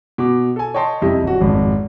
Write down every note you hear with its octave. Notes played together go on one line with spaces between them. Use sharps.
B2 D6
A4 G#5
C#5 D#5 G5 A5 C6
F2 C3 G3 E4 D#5
D#1 F#4
G#1 F2